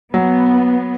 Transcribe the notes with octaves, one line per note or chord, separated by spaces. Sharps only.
F#3 B3